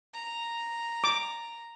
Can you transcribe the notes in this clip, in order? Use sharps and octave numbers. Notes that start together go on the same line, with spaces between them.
A#5
D6